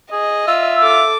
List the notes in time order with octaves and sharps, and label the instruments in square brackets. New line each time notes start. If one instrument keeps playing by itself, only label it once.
[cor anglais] G#4 [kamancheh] D#5
[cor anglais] F4 [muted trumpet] E5 [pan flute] E6
[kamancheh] A4 D6